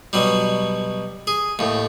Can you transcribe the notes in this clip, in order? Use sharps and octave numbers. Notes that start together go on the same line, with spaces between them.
B2 F#3 G3
G#4
D#2 A2